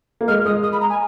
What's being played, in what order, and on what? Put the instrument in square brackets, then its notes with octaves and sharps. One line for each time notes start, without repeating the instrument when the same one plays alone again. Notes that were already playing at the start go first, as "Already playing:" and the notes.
[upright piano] A#3
[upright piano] G#3 [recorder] F6
[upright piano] G#3 [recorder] D#6
[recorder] D#6
B5
A#5
G#5